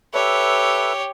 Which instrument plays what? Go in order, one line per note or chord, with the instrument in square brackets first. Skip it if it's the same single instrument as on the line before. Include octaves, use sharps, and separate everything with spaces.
[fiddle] G4 C#5 [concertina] A4 B4 E5